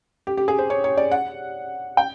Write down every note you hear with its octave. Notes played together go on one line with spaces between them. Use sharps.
G4
G4
G#4
C5
C#5
C#5
D5
F#5
G5